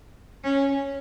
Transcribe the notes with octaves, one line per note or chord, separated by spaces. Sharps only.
C#4